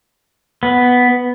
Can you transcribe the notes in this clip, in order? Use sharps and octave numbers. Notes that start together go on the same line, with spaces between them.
B3